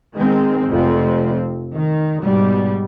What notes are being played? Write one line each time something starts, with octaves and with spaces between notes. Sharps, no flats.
D#3 G#3 C4
F1 F2 F3 C4
D#3
G#2 B2 G3